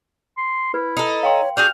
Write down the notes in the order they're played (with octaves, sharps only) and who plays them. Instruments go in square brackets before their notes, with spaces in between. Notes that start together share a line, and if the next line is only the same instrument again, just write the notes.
[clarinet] C6
[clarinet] E4 [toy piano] B4
[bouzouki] D#4 A4
[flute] C#5 [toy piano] F5 G5 C6
[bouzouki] D4 F#4 G#4 [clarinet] F6 [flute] G6